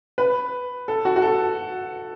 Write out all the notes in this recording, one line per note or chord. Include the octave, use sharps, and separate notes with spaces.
B4
A4
F#4
F#4
A4